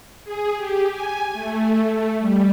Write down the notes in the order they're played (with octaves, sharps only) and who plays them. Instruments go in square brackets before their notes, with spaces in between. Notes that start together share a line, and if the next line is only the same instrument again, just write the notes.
[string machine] G#4
G4
G#5
A3
A3
G3